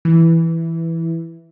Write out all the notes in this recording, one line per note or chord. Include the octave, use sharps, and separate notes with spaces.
E3